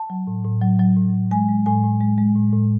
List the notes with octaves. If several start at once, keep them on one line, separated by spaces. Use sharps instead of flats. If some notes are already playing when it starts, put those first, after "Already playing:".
Already playing: A5
F#3
A2
A2
F#3
F#3
A2
A2
G#3 G#5
G#3
A2 G#5
A2
G#3
G#3
A2
A2